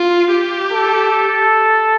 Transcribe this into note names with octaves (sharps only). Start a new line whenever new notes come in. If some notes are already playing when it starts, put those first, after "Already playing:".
Already playing: F4
G4
A4